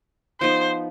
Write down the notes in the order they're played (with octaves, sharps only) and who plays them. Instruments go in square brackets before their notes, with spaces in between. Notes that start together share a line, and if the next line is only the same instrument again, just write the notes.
[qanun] F3 B3 D#4 B4 [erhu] C5